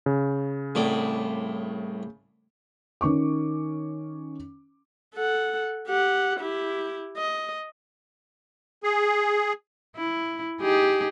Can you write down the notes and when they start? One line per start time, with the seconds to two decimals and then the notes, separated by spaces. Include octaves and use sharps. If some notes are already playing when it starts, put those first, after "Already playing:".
0.06 C#3
0.75 C2 A2 D5
3.01 D#3 C#4 C#6 D6
5.14 A4 F#5
5.88 G4 F#5
6.40 E4 G4
7.17 D#5
8.83 G#4
9.97 E4
10.62 D#4 G4 G#4